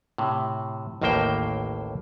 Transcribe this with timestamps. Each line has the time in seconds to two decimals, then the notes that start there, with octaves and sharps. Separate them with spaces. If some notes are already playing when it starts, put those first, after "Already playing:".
0.18 A2 C3
1.02 A1 D#2 A2 A#3 C5 G5